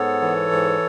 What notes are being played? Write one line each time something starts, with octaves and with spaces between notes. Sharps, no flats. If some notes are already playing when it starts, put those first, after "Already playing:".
Already playing: G#2 B3 A4 C#5
E3
G#2